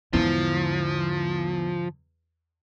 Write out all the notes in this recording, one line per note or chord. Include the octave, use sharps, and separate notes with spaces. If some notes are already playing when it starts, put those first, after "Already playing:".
E2 G#2 D3 F3